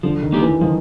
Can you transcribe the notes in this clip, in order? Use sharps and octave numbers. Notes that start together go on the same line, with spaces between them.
D3 F3
D#3
A#3 D#4 G4
E3
D#3 F3